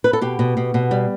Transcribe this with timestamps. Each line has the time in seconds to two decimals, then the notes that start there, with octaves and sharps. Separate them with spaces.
0.04 B4
0.13 A4
0.21 B2 G4
0.39 B2
0.57 B2
0.74 B2
0.91 G3